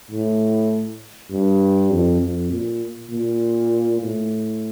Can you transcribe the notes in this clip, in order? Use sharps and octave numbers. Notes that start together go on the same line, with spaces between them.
A2
G2
F2
F2
A#2
A#2
A2